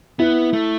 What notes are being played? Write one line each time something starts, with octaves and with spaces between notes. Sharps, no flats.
B3 E4
A3